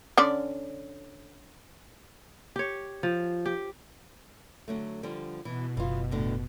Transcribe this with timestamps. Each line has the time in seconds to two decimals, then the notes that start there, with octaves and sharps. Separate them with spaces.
0.18 D3 C#4 D5
2.56 G4 C#5
3.03 F3
3.46 G4
4.68 D3 F#3 A3
5.03 D3 F3 G3
5.45 B2 E3
5.77 F#1 E3 F4
6.11 A2 D3